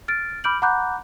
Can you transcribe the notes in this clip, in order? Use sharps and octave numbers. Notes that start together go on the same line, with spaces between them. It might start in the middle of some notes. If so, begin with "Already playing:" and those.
F6 A6 D7
B5 D6 F6 G6 D7 F#7
F#5 A#5 B5 D6 F#6 G6